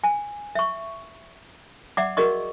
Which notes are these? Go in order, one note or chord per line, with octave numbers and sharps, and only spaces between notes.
G#5
E5 C#6
D5 E5 F#5 D6
F#4 G#4 A#4 D5 D#5 C#6